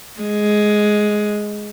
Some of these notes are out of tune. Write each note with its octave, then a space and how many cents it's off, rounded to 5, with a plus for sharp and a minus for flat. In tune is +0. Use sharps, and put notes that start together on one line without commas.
G#3 +10